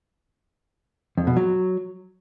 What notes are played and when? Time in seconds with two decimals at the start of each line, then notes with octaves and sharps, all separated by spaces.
1.18 F2
1.27 B2
1.36 F#3